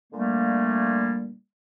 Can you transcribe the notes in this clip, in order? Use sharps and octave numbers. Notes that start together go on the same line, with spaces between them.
A#2 D3 G3 A3 A#3